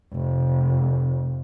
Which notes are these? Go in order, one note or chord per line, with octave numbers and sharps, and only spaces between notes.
F1